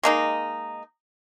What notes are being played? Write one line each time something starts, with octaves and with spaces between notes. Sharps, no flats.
G#3 A#3 D#4